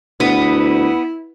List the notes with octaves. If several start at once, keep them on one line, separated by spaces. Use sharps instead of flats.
D2 B3 E4